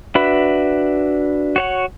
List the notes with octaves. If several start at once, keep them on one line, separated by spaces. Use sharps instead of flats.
D4 F#4 B4 E5 B5
F#4 C#5 F#5